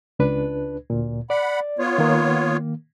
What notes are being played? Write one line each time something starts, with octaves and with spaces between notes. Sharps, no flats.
C#2 D4 B4
D2 A#2
D5 F#5 B5
B3 F4 C#5
D#3 A#3